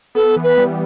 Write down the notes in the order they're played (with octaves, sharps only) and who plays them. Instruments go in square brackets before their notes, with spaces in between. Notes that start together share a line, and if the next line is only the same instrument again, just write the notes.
[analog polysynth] B3 [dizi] A4
[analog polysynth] E3
[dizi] B4
[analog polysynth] G3